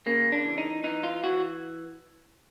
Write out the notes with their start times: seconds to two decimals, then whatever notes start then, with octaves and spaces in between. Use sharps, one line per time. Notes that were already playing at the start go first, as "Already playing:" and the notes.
0.06 C#3 A#3
0.32 D4
0.45 E3
0.58 D#4
0.84 E3 D#4
1.03 F4
1.24 E3 F#4